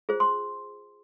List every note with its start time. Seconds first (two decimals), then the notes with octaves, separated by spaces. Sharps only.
0.09 F4 G#4 C5
0.20 C6